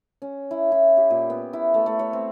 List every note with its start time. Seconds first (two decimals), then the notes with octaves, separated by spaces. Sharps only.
0.22 C#4
0.51 E4
0.72 E4
0.97 G4
1.10 A#2
1.30 B3
1.53 E4
1.74 A3
1.86 A3
1.99 C#5
2.13 C4